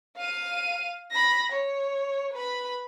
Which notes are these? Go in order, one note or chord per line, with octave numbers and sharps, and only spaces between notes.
F5 D#7
B5 A#6
C#5
B4 B5